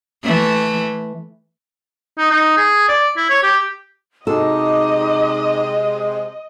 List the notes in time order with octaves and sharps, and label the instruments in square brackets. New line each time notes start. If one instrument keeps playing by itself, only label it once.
[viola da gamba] E3 A3
[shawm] D#4
D#4
G#4
D5
E4
C#5
G4
[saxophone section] C3 G#3 [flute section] D#4 D6 [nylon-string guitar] F#4 A4 [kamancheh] D#5